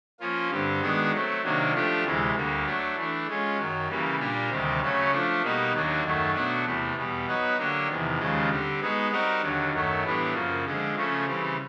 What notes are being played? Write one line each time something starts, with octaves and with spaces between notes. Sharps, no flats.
F3 A#3 C#4 F4
G2 D3 G3 C4
D#3 G#3 B3 D4 F#4
F#3 A3 C4
C3 D#3 F#3 A#3 D4
F3 A3 D4 G4
D2 C3 E3 G#3
D2 D3 G3 A#3
F#3 A3 D4
E3 A3 D4
G#3 C#4 F4
F#2 D#3 F#3
C#3 E3 G3 A#3
A#2 G3 A#3 D4 G4
D2 C3 D#3 G3 C4
C#3 F#3 A3 C#4
F3 A3 D4
B2 G3 A#3 D#4 F#4
D#2 D#3 F#3 A#3 D4
F#2 D#3 F#3 A3
B2 F#3 A3 D4 F#4
E2 C3 E3 A3
E2 B2 G3
F#3 B3 D#4 F#4 B4
D3 F#3 A#3 D4 G4
E2 C3 D#3
D#2 C#3 F3 G#3
D3 G3 C4
G#3 B3 D#4 F#4
G3 C4 D#4 F#4 A#4
D#2 D3 F#3
F#2 D#3 F#3 A3
A2 E3 G3 B3 D4
F#2 C#3 F3 A#3
D3 F3 G#3 C4
C#3 F3 A3 C#4
C#3 E3 G3 C4